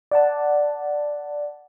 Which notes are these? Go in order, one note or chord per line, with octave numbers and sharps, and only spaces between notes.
D5 F#5 A5